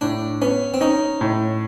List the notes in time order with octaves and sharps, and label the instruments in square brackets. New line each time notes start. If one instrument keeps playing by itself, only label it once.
[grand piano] A2 [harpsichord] D4
[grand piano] B3 [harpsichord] C#4
[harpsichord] C4
[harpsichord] C#4 [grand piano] D#4
[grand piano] A2